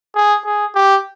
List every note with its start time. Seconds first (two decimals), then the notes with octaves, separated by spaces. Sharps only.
0.15 G#4
0.45 G#4
0.75 G4